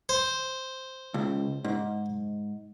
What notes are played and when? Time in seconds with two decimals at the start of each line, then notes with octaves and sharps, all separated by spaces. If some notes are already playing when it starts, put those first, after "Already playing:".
0.09 C5
1.14 C#2
1.64 G#2